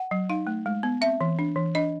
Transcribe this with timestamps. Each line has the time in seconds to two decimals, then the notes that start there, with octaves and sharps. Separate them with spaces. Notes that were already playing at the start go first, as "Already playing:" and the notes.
Already playing: F#5
0.11 F#3
0.30 D#4 F5
0.47 A3
0.66 G#3
0.83 B3
1.01 C4 E5
1.21 E3
1.39 D4
1.56 E3
1.75 D4 D#5